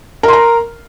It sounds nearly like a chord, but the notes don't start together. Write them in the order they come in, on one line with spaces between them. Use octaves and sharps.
A#4 C6 A#5